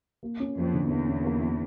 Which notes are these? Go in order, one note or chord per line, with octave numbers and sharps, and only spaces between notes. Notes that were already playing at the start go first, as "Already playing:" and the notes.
A#3
C#4
F2 A#3
D3
E2 A#3
C#4
A#3
A#3